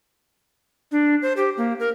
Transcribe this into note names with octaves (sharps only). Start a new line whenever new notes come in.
D4
C5
G4
A#3
A#4